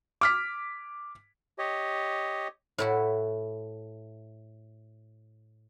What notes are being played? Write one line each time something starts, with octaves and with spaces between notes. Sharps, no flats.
D6 F6 B6
G4 C#5 D#5
A2 E4 F#4